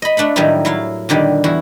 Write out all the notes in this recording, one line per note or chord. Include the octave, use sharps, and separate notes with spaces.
D#5 B5
A3 D4 F#5 B5
A2 D#3 F#3 G3 D#4 E4
F#3 E4 F5
A#2 D3 D#3 G3
E2 E4 F#4